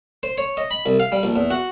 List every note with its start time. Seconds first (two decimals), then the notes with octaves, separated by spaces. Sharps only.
0.23 C5
0.38 C#5
0.57 D#5
0.71 B5
0.86 C2
1.00 F5
1.12 G3
1.23 A#1
1.36 E2
1.50 F#4